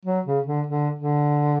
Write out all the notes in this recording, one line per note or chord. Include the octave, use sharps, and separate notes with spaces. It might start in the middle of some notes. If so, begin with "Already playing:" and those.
F#3
C#3
D3
D3
D3